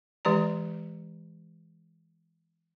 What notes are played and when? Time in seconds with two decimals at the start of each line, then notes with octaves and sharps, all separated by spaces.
0.25 E3 G#3 G4 D5 A#5